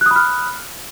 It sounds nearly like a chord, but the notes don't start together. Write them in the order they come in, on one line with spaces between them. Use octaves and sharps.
F#6 D#6 B5 F6